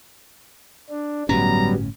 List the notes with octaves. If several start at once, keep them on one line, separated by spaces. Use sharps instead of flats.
D4
G1 A2 F#3 G3 B3 C#4 A#5